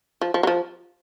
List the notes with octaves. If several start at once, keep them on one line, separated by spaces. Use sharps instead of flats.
F3
F3
F#3
F3